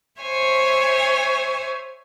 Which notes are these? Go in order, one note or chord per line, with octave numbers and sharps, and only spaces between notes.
C5 C#5 E5 G#5